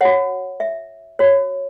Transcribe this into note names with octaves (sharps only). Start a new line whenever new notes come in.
F#4 C#5 F#5
E5
F#4 C#5